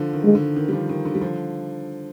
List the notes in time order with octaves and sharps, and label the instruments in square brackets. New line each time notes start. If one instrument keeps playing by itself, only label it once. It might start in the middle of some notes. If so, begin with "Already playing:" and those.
Already playing: [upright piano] D3 F3
D#3
[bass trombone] G#3
[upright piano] D3
D#3
G3
D3 F3
D#3
D3
G3
D3 F3